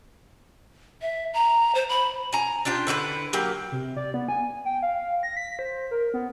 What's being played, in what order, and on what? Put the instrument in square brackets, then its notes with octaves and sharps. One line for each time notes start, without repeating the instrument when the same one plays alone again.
[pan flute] E5
A#5
C5
B5
[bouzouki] G#5 A#5
D4 F4 G4 C5
D3 E4 F#4 B4
F#3 A#3 G4
[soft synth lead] C3
D5
B3
G#5
G5
F5
A#6
B6
C5
A#4
B3